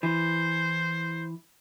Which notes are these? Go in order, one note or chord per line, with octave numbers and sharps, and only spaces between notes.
E3 C5